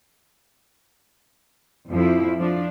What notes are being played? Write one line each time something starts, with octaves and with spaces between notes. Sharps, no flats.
F2 F3 E4
F3 D4